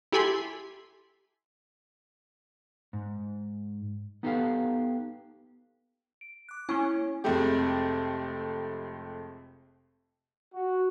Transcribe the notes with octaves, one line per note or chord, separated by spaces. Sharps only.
E4 G4 A4 G#5 B5 C6
G#2
B3 D#4 G4 A4 B4 F5
D7
D6 F#6
A#3 C#4 E4
F1 F2 G#3 A3 G4
F#4